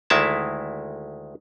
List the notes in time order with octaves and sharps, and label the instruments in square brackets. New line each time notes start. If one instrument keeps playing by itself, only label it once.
[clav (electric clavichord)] D2 D#3 G#3 E4 E5 A5